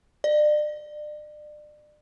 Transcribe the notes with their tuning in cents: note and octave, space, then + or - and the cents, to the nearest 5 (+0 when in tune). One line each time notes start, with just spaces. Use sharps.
D5 +35